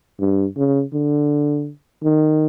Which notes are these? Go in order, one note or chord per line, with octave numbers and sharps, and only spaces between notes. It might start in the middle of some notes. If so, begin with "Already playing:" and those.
G2
C#3
D3
D#3